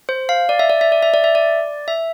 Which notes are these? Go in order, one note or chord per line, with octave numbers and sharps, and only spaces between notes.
C5
F5
D5
E5
D5
E5
D5
E5
D5
E5
D5
E5